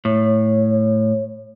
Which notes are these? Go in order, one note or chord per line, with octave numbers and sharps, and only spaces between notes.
A2 C#5